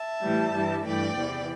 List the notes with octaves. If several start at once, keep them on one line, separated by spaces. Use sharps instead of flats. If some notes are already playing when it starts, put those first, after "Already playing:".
Already playing: E5 A5
A2 E3 G3
G2 E3 G3
G2 E3 A3 D5 G5
E2 C3 E3